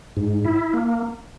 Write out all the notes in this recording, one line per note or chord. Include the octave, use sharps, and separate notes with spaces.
G#2
E4
A#3